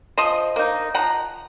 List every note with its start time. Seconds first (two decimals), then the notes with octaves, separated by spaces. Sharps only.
0.17 F3 C5 D#5
0.56 A#3 D#4
0.94 F3 F#5 A#5